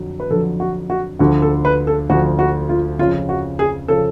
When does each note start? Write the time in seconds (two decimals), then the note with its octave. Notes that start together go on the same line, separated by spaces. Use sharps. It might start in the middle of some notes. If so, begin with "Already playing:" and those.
Already playing: F2 D3 F#3
0.20 B4
0.31 F2 D3 F#3 A4
0.60 F#4
0.90 F#4
1.19 D2 D3 F3 F#4
1.42 A4
1.65 B4
1.87 A4
2.09 D2 D3 F3 F#4
2.39 F#4
2.69 F4
2.99 F2 C#3 F3 F4
3.29 F#4
3.59 G#4
3.88 C#3 F3 A4